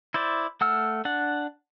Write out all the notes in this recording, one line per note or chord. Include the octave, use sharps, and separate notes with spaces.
E4 C5 D5
A3 F#5 E6 F6
D4 F#5